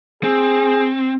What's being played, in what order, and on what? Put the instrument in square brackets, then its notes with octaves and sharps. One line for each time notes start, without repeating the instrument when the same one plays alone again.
[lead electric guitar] C4 [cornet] G#4